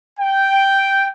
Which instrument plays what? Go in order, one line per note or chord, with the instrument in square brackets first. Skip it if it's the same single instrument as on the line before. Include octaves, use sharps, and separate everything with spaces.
[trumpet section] G5